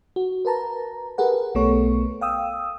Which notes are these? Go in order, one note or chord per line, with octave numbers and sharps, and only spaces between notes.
F#4
A#4 B4 A5 A#5
G4 G#4 A#4 B4 F#5
B1 A3 B3 A4 C#5 C#6
F5 G5 D#6 E6